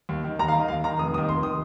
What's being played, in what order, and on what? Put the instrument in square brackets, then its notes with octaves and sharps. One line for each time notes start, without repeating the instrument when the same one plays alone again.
[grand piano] D#2
D#3
D#2 A#5
F5
D#3 D#5
D#2 F5
D#3 A#5
F1 D#6
D#2 D#6
D#3
F1 C6
D#3 D#6